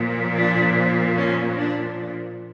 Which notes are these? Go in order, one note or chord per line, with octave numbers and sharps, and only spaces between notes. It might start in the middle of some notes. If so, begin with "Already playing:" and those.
Already playing: A#2 F3
D4
C#4
D4